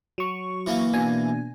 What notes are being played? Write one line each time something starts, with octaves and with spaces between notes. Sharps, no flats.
F#3 C#6
E3 A#3
B2 D4 G#5